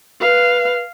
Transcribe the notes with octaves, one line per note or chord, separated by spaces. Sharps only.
B4 F5